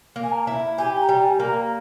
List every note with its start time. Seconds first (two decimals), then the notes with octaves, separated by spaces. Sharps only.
0.16 A#3
0.23 G#5
0.32 A#5
0.47 E4
0.78 G4 G#5
1.02 A#5
1.09 G3
1.18 G5
1.24 G#5
1.40 A#3
1.48 A#5